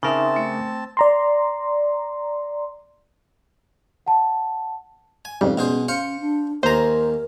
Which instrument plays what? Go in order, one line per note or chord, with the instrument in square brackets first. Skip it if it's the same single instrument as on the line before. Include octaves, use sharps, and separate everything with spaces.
[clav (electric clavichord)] C#3 A#4 [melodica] C4 A5 [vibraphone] D#4 E5 C6
[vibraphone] A3
[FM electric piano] D5 A#5 C6
[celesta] F#5 A5
[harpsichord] G#5
[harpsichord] F2 [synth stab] G#2 C#3 G3
[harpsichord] B2 G#4 C5 [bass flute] C#4
[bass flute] C#4 [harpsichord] C5 F5 [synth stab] C#7
[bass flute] D4
[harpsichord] D#2 G#5 [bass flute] A#4 [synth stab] C5 A#5